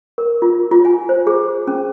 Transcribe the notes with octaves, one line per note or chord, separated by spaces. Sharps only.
A#4
F4
F4
G#5
C5
G#4
C#4